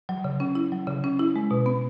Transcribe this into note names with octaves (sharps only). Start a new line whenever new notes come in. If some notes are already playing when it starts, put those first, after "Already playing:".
F#3
C#3
C#4
E4
F#3
C#3
C#4
E4
G#3
B2
B3